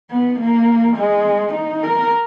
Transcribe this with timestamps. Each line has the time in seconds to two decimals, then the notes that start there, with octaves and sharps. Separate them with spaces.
0.11 B3
0.39 A#3
0.97 G#3
1.54 D#4
1.83 A#4